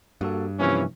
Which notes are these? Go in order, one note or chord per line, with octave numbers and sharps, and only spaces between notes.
G2 A#3 F#4 A4
C3 E3 F3 A#3 C#4